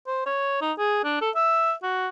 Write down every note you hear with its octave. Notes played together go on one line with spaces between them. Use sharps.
C5
C#5
D#4
G#4
D4
A4
E5
F#4